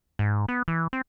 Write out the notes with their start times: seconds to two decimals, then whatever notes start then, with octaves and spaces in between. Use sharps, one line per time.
0.19 G#2
0.48 B3
0.68 E3
0.93 C4